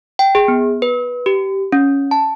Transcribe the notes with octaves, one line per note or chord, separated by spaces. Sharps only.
G5
G#4
B3
B4
G4
C#4
A5